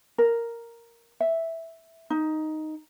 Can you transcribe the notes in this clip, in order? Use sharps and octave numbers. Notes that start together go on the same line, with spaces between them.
A#4
E5
D#4